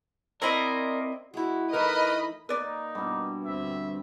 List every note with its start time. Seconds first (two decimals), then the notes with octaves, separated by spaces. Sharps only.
0.42 C4 E4 A#4 D5 D#5
1.34 G#3 E4 F#4
1.73 E3 A3 D#4 A#4 B4 D#5 B5
2.49 A#3 D#4 B4 D5
2.95 G2 B2
3.45 D2 C4 E5